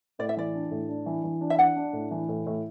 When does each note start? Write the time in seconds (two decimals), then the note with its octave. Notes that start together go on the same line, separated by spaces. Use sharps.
0.19 A2 D5
0.29 E5
0.37 E3 D5
0.55 D4
0.71 A2
0.89 D4
1.06 E3
1.24 E3
1.41 D4
1.50 E5
1.59 D4 F#5
1.76 D4
1.93 A2
2.11 E3
2.29 A2
2.46 A2